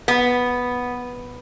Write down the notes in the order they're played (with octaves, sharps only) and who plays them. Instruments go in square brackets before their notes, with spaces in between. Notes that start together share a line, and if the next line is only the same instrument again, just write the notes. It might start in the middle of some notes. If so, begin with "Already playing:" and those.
[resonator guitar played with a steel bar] B3